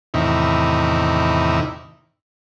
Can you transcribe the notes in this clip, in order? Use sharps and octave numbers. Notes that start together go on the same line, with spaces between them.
E2 A2 C3 D#3 D#4 E4